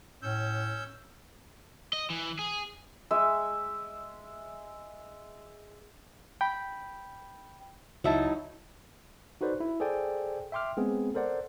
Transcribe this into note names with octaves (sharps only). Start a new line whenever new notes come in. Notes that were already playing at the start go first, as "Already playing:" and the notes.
A2 C#4 E6 G6
D#5
E3
G#4
G#3 E5
G5 B5
C#2 F#3 D#4 E4 E5 A5
D#4 F#4 A4 B4 C5 D5
E4
G#4 A4 C5 D5 G5 G#5
E5 G5 C6 D6 F6
G#3 B3 C4 G#4
A4 A#4 C5 D5 F#5